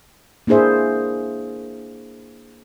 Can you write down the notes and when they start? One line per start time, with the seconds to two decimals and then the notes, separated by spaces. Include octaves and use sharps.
0.47 A#3 D4 E4 G#4 C5 E5